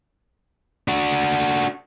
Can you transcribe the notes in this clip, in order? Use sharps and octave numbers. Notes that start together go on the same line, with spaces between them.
D4 F#4